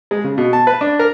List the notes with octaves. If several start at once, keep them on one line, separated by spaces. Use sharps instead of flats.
G#3
C#3
B2
A5
B4
D4
A#4